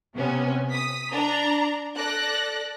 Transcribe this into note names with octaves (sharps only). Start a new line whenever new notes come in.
C3 B3 C#4
D#6 B6
D4 A#5
A4 D5 F#6 A#6